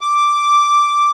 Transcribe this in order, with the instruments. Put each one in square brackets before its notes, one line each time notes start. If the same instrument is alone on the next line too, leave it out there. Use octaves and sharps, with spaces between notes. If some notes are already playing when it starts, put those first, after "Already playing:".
[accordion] D6